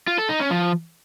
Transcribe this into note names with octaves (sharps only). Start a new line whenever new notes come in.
F4
A4
D#4
C#4
F3